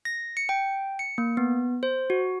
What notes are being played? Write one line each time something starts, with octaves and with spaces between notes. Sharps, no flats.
A#6
C#7
G5
C#7
A#3
B3
C5
F#4